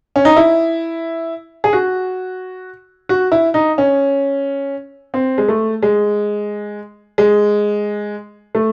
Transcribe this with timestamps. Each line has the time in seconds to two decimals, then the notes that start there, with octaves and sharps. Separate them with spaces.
0.16 C#4
0.25 D#4
0.36 E4
1.64 G#4
1.73 F#4
3.09 F#4
3.32 E4
3.54 D#4
3.78 C#4
5.14 C4
5.38 G#3
5.48 A3
5.83 G#3
7.18 G#3
8.55 A3